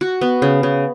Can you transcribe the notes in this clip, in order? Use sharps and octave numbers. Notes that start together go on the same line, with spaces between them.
F#4
B3
C#3
C#3